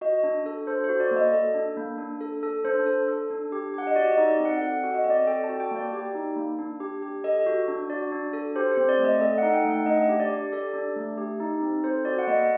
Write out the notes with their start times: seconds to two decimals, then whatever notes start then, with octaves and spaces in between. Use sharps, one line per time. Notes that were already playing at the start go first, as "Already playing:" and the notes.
0.01 F#4 D#5
0.23 D4
0.46 A4
0.67 A4 C5
0.84 C5
0.89 F#4
1.00 D5
1.11 A#3
1.16 D#5
1.33 A4
1.55 D4
1.77 A#3
1.98 D4
2.21 A4
2.43 A4
2.65 D4 C5
2.86 A4
3.08 A4
3.30 D4
3.52 G4
3.74 G4 F#5
3.87 D#5
3.95 F#4 D5
4.12 D#5
4.18 D#4
4.28 D5
4.40 C4
4.45 F#5
4.61 A4 F#5
4.84 F#4
4.94 D#5
5.04 C4 D#5
5.10 D5
5.27 A4 G5
5.44 A5
5.49 F#4
5.60 G5
5.71 A#3
5.76 D5
5.93 G4
6.15 D#4
6.36 A#3
6.59 D4
6.80 G4
7.02 G4
7.24 A4 D#5
7.46 F#4
7.68 D4
7.90 F#4 D5
8.12 D4
8.33 A4
8.56 G4 C5
8.72 C5
8.77 C4
8.89 D5
8.99 A3
9.04 D#5
9.20 A4 D#5
9.38 F#5
9.43 D#4
9.54 G5
9.65 A3
9.70 F#5
9.86 D4 D#5
10.09 G4
10.20 D5
10.30 G4
10.53 A4 D5
10.74 D4
10.96 A3
11.18 G4
11.40 D#4
11.62 C4
11.84 A4 C5
12.05 F#4 D5
12.19 F#5
12.27 A#3 D#5